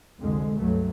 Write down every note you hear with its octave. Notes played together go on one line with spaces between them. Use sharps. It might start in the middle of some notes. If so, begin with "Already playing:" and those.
C2 F2 D3 G#3
C#2 G2 F#3 A3